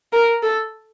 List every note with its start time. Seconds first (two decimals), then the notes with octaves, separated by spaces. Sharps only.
0.12 A#4
0.43 A4